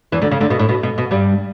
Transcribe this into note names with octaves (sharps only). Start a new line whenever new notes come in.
E2 E3
D2 D3
C#3
D2 D3
B2
A2
B2
B2
B2
G2 G3